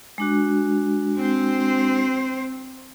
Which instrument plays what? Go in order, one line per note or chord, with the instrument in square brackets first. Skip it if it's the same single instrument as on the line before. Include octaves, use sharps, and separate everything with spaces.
[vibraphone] G#3 D4 F#4
[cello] C4 C5